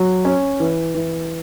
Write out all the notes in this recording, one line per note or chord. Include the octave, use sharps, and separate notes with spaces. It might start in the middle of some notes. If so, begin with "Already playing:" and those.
Already playing: F#3
C#4
E3
E3